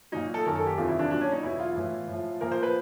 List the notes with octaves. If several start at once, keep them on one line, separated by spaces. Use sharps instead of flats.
A#2 F#3 D#4
A4
F#2 D#3 F#3 A#4
A4
G4
E2 C3 D#3 F#3 F4
E4
D4
A#2 F#3 D4
C#4
D#4
E2 B2 F#3 E4
F4
A2 E3
A2 F3
A#2 F3 A#4
C5
B4